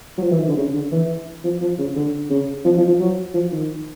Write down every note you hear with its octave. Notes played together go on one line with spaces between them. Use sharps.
F#3
F3
E3
D#3
D3
C#3
D3
E3
F3
F3
C#3
D3
C#3
F3
F3
F3
F#3
F3
D#3